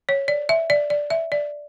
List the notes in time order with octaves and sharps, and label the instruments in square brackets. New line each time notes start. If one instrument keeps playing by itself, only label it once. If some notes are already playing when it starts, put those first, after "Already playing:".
[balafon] C#5
D5
E5
D5
D5
E5
D5